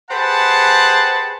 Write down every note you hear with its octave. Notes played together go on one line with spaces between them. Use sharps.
G4 G#4 B4 C5 F#5 A5